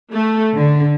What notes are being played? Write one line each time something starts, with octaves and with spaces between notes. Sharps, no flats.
A3
D3